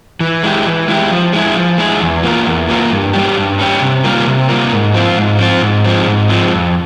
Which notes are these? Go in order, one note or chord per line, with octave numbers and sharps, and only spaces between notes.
E3
G#3 E4 G4
E3
G#3 E4 G4
F3
G#3 E4 G#4
F3
G#3 E4 G#4
E2
E3 A#3 F4 A#4
E2
E3 A#3 F4 A#4
G2
G3 C#4 G4
G2
G3 C#4 G4
C3
G3 A#3 F4 A#4
C3
G3 A#3 F4 A#4
G#2
F3 C4 F4
G#2
F3 C4 F4
G#2
F3 G#3 C4
G#2
F3 G#3 C4
F2